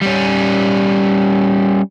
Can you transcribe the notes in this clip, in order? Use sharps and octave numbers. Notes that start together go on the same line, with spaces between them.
G3 C#4